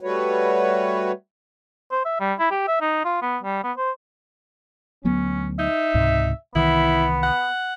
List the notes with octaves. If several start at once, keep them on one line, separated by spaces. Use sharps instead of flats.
G3 A3 F#4 B4 C#5
C5
E5
G3
E4
G4
E5
D#4
F4
B3
G3
B3
C5
D2 F#3 B3 C#4
D#4 E5
C#2 G#2 C3
C2 D#3 E3 B3 E4
F#5